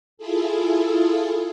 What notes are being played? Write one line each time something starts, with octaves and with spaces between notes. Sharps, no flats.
E4 F4 G#4 A4